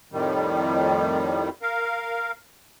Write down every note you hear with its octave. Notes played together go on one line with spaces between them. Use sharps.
F2 A2 D#3 G3
A#4 F5